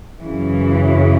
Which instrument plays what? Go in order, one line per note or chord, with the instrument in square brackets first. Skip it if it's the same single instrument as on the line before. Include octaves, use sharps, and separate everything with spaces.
[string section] F#2 C#3 E3